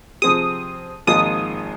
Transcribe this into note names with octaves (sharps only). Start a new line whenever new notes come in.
C3 F3 C4 G#4 D#6
G#1 G#2 F3 A#3 F4 D#6